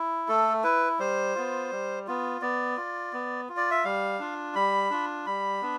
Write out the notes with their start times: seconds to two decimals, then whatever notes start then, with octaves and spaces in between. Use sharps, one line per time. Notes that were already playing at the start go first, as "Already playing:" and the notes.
Already playing: E4
0.28 A3 A4
0.64 E4 B4
0.99 G3 C5
1.35 B3 F4
1.71 G3
2.07 B3 F4
2.42 B3 D5
2.77 F4
3.13 B3
3.49 F4
3.57 D5
3.71 E5
3.84 G3 F5
4.19 D4 F4
4.55 G3 B5
4.90 D4 F4
5.26 G3 B5
5.62 B3 D4